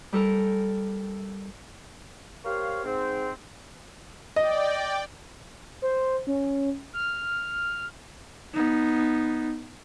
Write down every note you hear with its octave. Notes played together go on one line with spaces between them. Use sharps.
G3 A4 A#4
A#3 G4 A#4 C5 C#5 F5
G#2 C4
D5 D#5 G5
C5
C#4
F6
B3 D#4